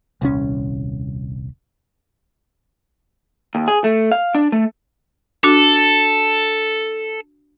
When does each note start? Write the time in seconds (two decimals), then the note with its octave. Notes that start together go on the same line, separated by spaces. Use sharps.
0.21 D#1 C2 C#4
3.55 D#2
3.68 G#4
3.84 A3
4.12 F5
4.35 D4
4.52 A3
5.44 D4 F#4 A4